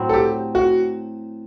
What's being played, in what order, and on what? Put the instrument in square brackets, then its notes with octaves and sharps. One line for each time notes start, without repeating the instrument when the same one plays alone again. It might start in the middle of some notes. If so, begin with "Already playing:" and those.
Already playing: [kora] A2 F#3 C4
[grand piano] A4
G4
F#4